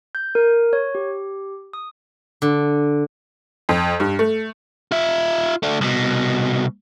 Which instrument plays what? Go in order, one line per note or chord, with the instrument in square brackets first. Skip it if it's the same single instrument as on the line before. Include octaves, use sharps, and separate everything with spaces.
[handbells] G6
A#4
C#5
G4
D#6
[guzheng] D3
[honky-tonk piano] F2
G2
A3
[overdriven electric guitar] F4 E5
A3 D4
C2 B2